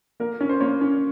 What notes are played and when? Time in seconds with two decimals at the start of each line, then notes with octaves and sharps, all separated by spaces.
0.20 A#3 A#4
0.41 C#4
0.49 C5
0.60 A#3 C#5
0.81 C#4